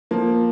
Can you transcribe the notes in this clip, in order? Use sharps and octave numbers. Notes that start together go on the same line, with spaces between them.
F3 A#3